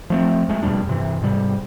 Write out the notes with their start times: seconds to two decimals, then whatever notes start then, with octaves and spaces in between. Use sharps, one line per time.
0.10 F3 A3 C4
0.48 F2 G#3 A3
0.63 F2 B2 G3 D4
0.87 G2 C3 E3
1.21 G#2 C3 G3